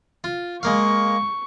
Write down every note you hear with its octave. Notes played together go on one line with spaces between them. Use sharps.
F4
G#3 A#3 F5 C#6